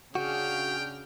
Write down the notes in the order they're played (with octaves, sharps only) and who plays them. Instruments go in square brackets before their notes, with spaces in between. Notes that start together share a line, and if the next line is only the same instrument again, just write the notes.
[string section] C#3 D4 F6 [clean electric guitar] F#4 [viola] G#4 [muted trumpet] G5